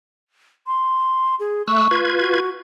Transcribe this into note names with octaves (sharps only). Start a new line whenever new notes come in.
C6
G#4
A3 C#6 E6 F#6
F4 B4 G#6
F#4